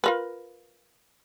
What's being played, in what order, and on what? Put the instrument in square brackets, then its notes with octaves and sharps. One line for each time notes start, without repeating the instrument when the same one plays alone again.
[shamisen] F4 A#4 B4